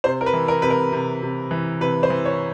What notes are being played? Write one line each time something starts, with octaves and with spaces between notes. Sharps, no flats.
C3 C5
A#4
B4
E3
A#4
C3 B4
A#4
C3
C3
E3
C3 B4
C5
E3
C#5